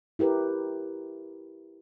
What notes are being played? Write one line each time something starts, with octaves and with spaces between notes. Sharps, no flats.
E4 G4 A#4 B4